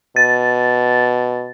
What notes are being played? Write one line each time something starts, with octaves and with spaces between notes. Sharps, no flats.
B2 A6